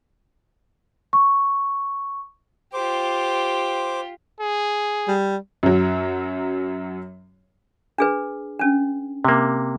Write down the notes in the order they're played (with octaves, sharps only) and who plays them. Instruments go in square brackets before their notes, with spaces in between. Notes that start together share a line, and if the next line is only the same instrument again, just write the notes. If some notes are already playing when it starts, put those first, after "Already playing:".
[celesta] C#6
[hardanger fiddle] F4 G4 [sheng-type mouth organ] C5 D6
[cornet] G#4
[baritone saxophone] G3
[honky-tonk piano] F#2 F#3
[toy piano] D4 G#4 B4
C#4 D4
[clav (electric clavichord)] C3 A#3